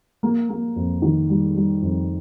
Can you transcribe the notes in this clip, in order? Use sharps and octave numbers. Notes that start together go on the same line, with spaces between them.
A#3
A#3
F2
D#3
G3
G3
F2